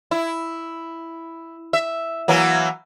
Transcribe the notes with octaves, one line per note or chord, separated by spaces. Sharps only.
E4
E5
E3 F#3 A#3